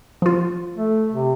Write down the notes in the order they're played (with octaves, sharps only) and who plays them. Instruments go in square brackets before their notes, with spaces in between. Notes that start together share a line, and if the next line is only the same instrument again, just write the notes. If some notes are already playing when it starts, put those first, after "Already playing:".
[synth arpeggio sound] F3 F4
[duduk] A3
C3